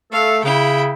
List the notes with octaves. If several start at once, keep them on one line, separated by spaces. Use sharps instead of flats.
A3 A4 F5
C#3 E4 G5